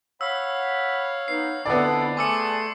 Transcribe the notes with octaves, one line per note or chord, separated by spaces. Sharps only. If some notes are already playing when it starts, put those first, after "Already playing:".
C#5 F5 F#5 B5 E6
B3 D#4 C7
F2 D3 B3 D4 E4 A4 D5
A3 G#4 G#5 A5 C6 D6 E6 C#7